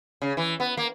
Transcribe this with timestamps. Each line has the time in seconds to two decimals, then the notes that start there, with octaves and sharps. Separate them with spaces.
0.22 C#3
0.37 E3
0.60 B3
0.77 A#3